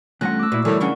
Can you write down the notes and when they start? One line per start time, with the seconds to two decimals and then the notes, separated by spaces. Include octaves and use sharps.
0.21 E2 G2 A3 C#4 F4 F#5 F#6 A#6
0.39 D6 E6
0.52 A#2 E4 F#4 B4
0.65 A2 D3 E3 G3 E4 A#4
0.80 C#3 C#4 D4 E4 F#5 C#6